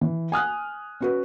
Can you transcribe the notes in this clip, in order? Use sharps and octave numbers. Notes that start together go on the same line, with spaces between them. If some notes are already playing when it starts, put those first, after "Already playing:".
E3
G#5 D#6 F6 F#6
C#4 F#4 B4